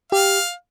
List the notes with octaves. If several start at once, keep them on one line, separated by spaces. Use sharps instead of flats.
G4 F5